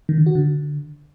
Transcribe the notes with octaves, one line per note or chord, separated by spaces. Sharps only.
D#3
D3
F#4
D3